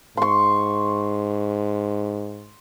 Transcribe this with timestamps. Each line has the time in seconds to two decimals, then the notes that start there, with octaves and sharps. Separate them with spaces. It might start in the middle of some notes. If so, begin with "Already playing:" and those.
0.17 G#2 C6 C#6